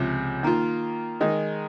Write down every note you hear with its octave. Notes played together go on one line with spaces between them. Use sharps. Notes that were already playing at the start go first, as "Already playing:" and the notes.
Already playing: C#2 C3 F3
D#3 A#3 F4
D#3 G#3 D#4